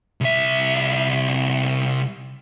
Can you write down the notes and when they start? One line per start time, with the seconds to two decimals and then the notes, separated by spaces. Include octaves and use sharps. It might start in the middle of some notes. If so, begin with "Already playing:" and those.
0.21 C2 E5